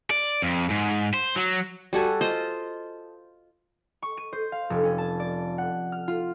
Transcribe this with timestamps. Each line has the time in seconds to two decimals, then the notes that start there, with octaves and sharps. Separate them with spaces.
0.10 D5
0.42 F2
0.70 G#2
1.14 C5
1.36 F#3
1.93 G3 F#4 A4 G#5
2.21 F4 C5 D#5
4.02 C#6
4.17 D#7
4.33 C5
4.52 F5
4.70 F1
4.83 C#4
4.98 A5
5.20 D5
5.58 F#5
5.92 F6
6.08 F4